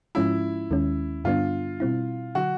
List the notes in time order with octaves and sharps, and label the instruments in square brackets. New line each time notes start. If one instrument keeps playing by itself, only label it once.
[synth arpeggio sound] G#2 F3 G#3 C#4 F4 [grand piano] E4
[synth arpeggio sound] D#2 D#3 G#3 C#4
[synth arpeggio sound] G2 D3 G3 B3 D4 [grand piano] F4
[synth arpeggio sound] B2 G3 C4 E4
[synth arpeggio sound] D3 F#3 [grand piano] F#4